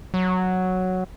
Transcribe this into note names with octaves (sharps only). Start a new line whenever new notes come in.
F#3